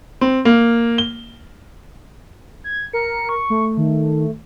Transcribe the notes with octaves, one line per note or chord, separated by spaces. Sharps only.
C4
A#3
G7
G#6
A#4 C#7
C#6
A3
D#3